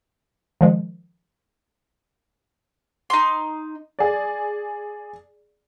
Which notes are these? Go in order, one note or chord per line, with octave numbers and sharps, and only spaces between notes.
D#3 F3 G#3
D#4 C6
G#4 D5